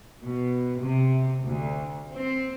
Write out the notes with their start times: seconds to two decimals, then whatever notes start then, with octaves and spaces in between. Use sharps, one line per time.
0.21 B2
0.79 C3
1.42 D2
2.14 C4